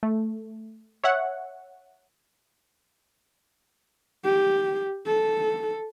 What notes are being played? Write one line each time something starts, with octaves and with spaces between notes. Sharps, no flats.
A3
C#5 E5 F#5
G4
A4